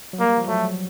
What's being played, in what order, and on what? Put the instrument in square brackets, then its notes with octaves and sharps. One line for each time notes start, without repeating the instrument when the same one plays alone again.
[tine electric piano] F#3
[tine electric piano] G3 [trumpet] A#3
[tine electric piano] F3
[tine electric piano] F#3 [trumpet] A3